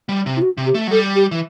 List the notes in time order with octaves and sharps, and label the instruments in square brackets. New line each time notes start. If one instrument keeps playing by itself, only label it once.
[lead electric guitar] G3
C3
[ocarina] E4
F#4
[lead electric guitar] C3
[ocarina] G4
[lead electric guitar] A3
F#3
[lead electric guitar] G3 [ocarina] A4
[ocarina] G4
[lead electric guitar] E3